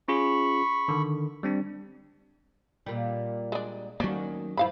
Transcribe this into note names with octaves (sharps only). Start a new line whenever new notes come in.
C#4 F4 G#4 B5 C#6
D3 D#3
G3 C4 D4
A#2 G3
G#3 D4
D#3 F#3 A3 A#3 C#4 D4 F#4
G2 F3 E4 F5 B5